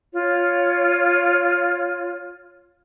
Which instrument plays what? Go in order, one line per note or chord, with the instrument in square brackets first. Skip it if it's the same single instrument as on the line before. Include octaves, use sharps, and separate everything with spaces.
[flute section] F4 C#5